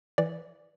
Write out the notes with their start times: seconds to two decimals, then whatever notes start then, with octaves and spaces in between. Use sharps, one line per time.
0.18 E3 D5